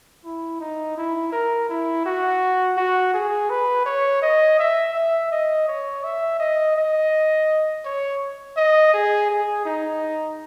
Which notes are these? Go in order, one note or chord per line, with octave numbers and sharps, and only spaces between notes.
E4
D#4
E4
A#4
E4
F#4
F#4
G#4
B4
C#5
D#5
E5
E5
D#5
C#5
E5
D#5
D#5
C#5
D#5
G#4
G#4
D#4